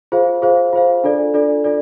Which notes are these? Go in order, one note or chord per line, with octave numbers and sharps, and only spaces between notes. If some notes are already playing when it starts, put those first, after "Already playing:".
F4 G#4 C5 F5
F4 G#4 C5 F5
F4 G#4 C5 F5
D4 F4 A4 D5
D4 F4 A4 D5
D4 F4 A4 D5